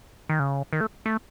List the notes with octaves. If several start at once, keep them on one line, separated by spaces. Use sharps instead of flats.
D#3
C#3
D#3
A3
A3